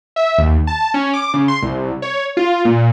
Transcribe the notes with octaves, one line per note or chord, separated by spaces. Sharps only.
E5
D#2
A5
C#4
D6
C#3
C6
C2
C#5
F4
A#2